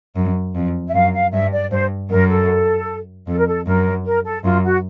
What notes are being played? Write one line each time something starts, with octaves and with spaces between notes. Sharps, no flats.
F#2
F2
E5
F#2 F5
F5
G2 E5
D5
G2 C5
F#2 A#4
A4
F2 A4
A#4
A4
F#2 A#4
A#4
A4
F#2 F4
F#4